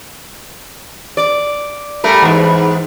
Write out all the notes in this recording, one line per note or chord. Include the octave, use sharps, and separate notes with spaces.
D5
G3 A3 A#4
E2 G#2